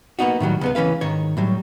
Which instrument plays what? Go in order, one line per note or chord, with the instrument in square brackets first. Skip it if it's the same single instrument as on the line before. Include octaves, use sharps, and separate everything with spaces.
[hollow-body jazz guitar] A#3 B3 D#4 F#4
A2 D#3 F#3 G3
C#2 B3 B4
C#2 E3 C#4 B4 F5
G#2 D#3 C#5
A2 F#3 G3